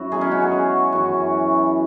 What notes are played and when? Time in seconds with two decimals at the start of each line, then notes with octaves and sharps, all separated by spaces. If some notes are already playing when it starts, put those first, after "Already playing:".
Already playing: F#2 E4 F#4
0.12 B2 F#3 G#4
0.21 C#4
0.32 F#4
0.42 G#4
0.52 C#5
0.92 F#2 E3 F#4